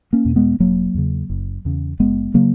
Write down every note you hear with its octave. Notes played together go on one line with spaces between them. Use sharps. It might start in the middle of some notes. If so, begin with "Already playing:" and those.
A#3 C#4
E2 B2
G#3 B3
E1 F#3 A#3
E2 C#3
F#1
E2 C#3
F#1 G#3 B3
C#3 F#3 A#3